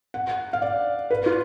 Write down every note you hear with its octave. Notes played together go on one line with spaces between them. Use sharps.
F#5
F5
D5
B4
F4